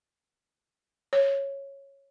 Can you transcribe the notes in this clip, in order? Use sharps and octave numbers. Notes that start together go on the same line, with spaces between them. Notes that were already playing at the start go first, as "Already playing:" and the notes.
C#5